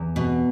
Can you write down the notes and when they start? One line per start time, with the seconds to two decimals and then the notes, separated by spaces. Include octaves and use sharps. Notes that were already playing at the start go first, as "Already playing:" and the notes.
Already playing: E2
0.16 B2